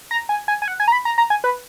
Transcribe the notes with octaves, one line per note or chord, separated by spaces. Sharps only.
A#5
G#5
G#5
G#5
F#5
G#5
A#5
B5
A#5
A#5
G#5
B4